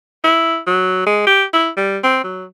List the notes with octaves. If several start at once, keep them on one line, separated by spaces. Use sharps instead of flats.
E4
F#3
G#3
G4
E4
G3
C4
F#3